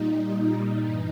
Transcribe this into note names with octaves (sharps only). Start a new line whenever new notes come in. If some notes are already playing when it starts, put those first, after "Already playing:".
Already playing: A#2 G3 D#4
G2 E3